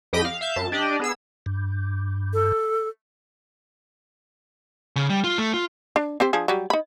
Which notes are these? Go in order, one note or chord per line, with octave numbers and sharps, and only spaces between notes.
F2 G4 D#5 G5 B5 A#6
F5
E5 F5 G6
F#2 A5
D4 G4 D5 D#5
B3 G#4 E6
G2
A4
C#3
G3
F4
A3
F4
D4
C4 G4 C5
F3 D4 G#4
F#3 G3
D#4 B5